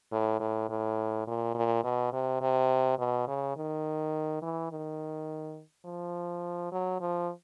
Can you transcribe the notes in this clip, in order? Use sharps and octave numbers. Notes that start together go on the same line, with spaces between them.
A2
A2
A2
A#2
A#2
B2
C3
C3
B2
C#3
D#3
E3
D#3
F3
F#3
F3